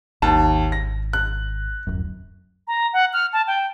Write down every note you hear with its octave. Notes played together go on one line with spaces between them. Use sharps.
G#1 D#2 A5
A#6
F#6
D1 G1 F#2
A#5
F#5
F6
A5
G5